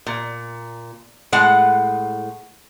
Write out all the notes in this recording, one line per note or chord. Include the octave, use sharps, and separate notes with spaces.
A#2
A2 G#3 F#5